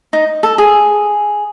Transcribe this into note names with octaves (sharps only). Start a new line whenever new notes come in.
D#4
A4
G#4